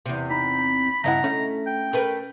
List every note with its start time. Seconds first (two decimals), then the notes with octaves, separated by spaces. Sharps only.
0.06 E2 C3
0.30 C4 D#4 A#5 B5
1.04 G2 C#3 C#4 E4 D#5 F#5 A#5
1.24 A3 C#4
1.67 G5
1.93 A3 A#4 B4